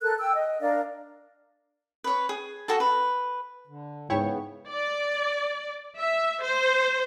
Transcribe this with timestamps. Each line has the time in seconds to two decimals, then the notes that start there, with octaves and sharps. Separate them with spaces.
0.01 A4 A#4 F#6
0.18 G5 E6
0.35 D#5
0.60 D4 A#4 D5 F5
2.04 B4 C#5
2.29 G#4
2.68 F#4 A4 A5
2.80 B4
3.67 D3
4.10 G#2 C#3 B3 E4 C#5 G5 C#6
4.69 D5
5.99 E5
6.42 C5